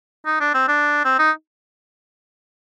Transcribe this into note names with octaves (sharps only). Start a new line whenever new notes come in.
D#4
D4
C4
D4
C4
D#4